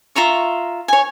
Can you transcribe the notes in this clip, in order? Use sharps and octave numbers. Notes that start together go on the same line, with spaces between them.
F4 E5 A#5 C#6
C#5 G#5